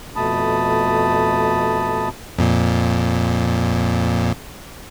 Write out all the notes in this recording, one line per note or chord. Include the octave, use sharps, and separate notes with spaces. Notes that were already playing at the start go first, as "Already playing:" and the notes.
F2 B2 A3 A5 B5 D#6
F2 A#2